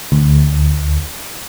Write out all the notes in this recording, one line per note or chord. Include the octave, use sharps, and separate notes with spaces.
D2